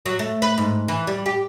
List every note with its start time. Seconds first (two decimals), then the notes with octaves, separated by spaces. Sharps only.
0.06 F#3
0.19 A3
0.42 B4
0.58 G#2
0.88 E3
1.07 G3
1.26 G4